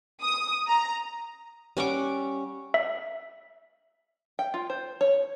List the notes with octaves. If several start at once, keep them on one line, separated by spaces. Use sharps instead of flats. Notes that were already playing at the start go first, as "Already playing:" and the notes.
D#6
A#5
G3 C#4 F#5 D6
E5
G5
F4
C5
C#5